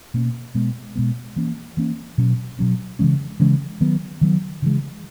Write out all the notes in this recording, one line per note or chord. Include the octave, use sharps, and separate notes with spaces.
B2 A#3 C#4
B2 G#3 B3
B2 G#3 B3
E3 A#3 C#4
E3 A#3 C#4
B2 F#3 C#4
B2 F#3 C#4
C#3 E3 G#3 C#4
C#3 E3 G#3 C#4
D#3 F#3 B3
D#3 F#3 B3
C#3 E3 G#3